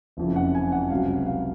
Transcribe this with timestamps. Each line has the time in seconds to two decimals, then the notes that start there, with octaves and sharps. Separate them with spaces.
0.17 F#1 F2 C#3 F3
0.36 F#5
0.55 G#5
0.72 F#5
0.90 C#2 C3 F#3 F5
1.26 F5